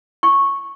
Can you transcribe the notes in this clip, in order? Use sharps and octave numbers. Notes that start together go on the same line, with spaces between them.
C#6